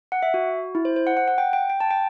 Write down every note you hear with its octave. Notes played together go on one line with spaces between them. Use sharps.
F#5
E5
F#4
E4
C5
C5
F#5
F#5
F#5
G5
G5
G5
A5
G5